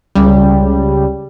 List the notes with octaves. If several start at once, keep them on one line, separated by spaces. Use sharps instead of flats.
C#2 C#3 G3